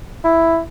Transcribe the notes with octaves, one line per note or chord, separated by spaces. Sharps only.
E4